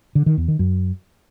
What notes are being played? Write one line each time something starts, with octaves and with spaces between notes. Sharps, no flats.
D3
D#3
E2
D#3
F#2